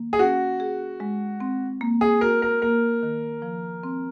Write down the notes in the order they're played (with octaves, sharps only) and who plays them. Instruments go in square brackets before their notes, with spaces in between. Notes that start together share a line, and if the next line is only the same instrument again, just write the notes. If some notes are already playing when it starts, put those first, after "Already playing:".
Already playing: [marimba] D#3 A#3
[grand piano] G#4
[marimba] C#4 [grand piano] F#4
[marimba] G#4
G#3
C4
A#3
[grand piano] G#4
[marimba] F#4 [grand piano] A#4
[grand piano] A#4
[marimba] A#3 [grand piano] A#4
[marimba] D#3
F3
C4